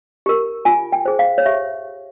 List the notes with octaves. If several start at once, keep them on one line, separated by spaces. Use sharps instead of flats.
G4 A#4
F4 G#5
G5
G#4 C5
F5
C#5
G4 E5